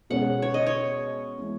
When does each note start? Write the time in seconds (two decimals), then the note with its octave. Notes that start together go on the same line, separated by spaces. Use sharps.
0.10 B2 G#3 C#4 G#4 F#5
0.42 C#5
0.54 D#5
0.67 C#5
1.38 E3 G#3 B3 E4